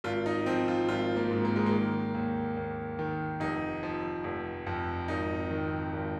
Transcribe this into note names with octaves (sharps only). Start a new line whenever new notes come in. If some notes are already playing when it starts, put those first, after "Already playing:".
G#1 F4
D#4
F3 C4
F4
G#1 F4
A#3
G#2
A#3
G#3
A#3
D#3
D#2
D#2
D#3
F1 D#4
F3
F1
F2
G#1 D#4
D#3
G#1